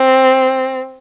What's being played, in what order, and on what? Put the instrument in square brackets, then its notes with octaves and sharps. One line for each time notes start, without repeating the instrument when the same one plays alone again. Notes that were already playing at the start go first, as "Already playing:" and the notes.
Already playing: [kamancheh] C4